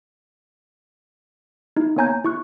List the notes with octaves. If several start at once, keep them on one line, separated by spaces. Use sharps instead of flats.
D#4 E4
A#3 B3 C#5 G#5 A#5 G6
E4 C#6 F#6